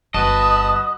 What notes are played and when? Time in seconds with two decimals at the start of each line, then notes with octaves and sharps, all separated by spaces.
0.14 G1 G2 F#4 B4 D#5 A5